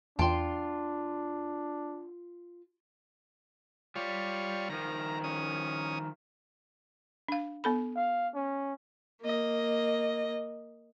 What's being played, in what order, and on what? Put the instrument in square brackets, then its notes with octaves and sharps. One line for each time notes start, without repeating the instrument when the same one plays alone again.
[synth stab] E2 C6 [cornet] D4 [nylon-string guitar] F4 G5 A5
[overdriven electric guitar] G3 [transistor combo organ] F4 C#5
[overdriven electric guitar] D#3 F3 [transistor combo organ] A#5
[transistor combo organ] C#4 D#6
[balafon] D4 F5
B3 A4 B5
[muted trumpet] F5
C#4
[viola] A#3 D#5